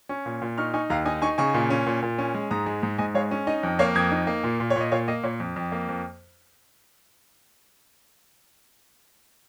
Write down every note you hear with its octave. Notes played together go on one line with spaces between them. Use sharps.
C#4
A#2
A#2
D#4 C#6 F6
D#4 G#5 C#6
D#2 F5 A#5
D#4 D#5 G#5
D#4 G#5 C#6
C#3 G#5 C#6
A#2
C#4
A#2
A#2
C#4
G#3
G#2 A#5 D#6
G#3
G#2
G#2 D#5 G#5
G#3 C#5 F5
C#4
D#4 D#5
F2
A#3 C#5 F5
F2 D#6 G#6
D#4
A#3
A#2
A#2
C#5
A#2
D#5
A#2 C#5 F5
A#3 D#5
A#2 C#5
F2
F2
A#3
F2